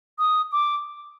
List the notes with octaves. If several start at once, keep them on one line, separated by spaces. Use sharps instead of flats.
D#6
D6